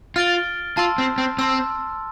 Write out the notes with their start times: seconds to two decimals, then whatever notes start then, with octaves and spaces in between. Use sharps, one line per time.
0.16 F4 F6 A6 D7 G7
0.77 F4 A5 C6 E6
0.98 C4
1.18 C4
1.38 C4 A5 C6 E6